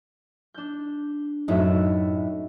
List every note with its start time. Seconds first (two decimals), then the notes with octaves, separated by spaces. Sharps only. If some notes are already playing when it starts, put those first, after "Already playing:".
0.54 D4 G6
1.48 F#2 A2 D#4 F#4 E5